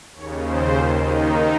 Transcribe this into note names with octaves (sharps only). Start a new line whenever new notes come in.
D#2 C#3 C#5
C5
D#2 D#3 F4
D#4